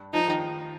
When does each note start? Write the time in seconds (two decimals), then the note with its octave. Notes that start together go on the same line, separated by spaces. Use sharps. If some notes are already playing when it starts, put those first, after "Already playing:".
Already playing: G2
0.13 F3 D#4
0.28 D#3